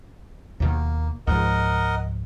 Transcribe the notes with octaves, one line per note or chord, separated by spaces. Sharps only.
D#2 B2 D#3 A#3
C#2 G#2 F3 A#4 D#5 F#5